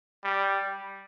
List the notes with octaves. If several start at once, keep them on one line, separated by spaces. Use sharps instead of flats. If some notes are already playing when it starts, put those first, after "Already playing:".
G3